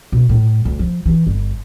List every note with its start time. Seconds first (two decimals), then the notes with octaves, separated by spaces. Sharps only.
0.12 B2
0.29 A2
0.65 D2
0.79 F3
1.06 E3
1.27 G1